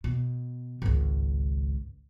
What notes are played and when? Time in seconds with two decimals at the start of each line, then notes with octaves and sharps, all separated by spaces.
0.04 B2
0.82 G#1 C#2